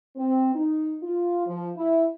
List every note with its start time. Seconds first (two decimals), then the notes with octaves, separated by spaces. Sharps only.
0.17 C4
0.55 D#4
1.03 F4
1.47 F3
1.76 E4